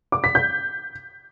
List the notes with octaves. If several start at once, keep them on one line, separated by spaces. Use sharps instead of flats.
D6
B6
G6